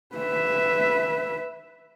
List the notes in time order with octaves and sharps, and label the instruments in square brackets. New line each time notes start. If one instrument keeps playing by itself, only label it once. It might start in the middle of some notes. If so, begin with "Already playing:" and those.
[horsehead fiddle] B4 E5